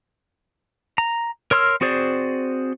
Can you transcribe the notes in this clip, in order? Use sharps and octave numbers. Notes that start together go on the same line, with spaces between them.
A#5
A#4 C#5 C6 E6 F6
C4 F#4 G#4 C5 D5